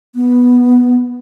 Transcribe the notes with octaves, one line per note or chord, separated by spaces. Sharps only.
B3